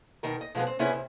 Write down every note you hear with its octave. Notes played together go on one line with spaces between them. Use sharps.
B2 D#3 A#4
D#5
B2 F3 G#3 B3 C4
C4
C3 B3 C#4 E4 G#4
C3